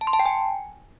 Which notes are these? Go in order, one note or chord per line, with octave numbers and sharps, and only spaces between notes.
A5
C6
A5
G5
G#5